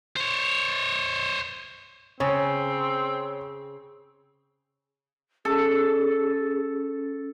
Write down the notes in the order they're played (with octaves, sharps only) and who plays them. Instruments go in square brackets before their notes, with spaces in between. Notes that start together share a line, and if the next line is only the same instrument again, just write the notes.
[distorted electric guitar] C5 C#5
[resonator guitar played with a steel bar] C#3 [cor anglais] C4 [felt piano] C#5
[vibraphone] C#4 [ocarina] G#4 [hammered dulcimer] A4